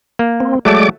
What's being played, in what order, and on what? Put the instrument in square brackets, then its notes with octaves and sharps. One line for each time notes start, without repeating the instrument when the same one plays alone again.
[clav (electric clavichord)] A#3
[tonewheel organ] C4
[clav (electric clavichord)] F#3 A3 A5 [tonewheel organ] G#3 D5 D6